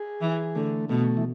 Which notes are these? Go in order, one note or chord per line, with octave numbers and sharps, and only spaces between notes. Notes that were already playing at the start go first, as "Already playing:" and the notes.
Already playing: G#4
E3
D3 A3
B2 A3
E3